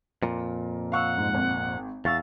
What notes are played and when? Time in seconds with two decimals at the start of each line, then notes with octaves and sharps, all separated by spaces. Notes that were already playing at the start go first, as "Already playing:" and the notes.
0.22 F2 A#2
0.92 F5 F#5 C#6 E6
1.18 G#2
1.34 G#1
2.05 E2 F5 C#6 E6 A6